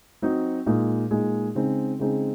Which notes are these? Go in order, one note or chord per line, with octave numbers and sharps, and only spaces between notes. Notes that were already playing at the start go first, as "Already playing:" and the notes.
F#3 C4 D#4
A#2 G#3 D#4 G#4
A#2 G#3 D#4 G#4
C#3 G#3 C4 D#4 G#4
C#3 G#3 C4 D#4 G#4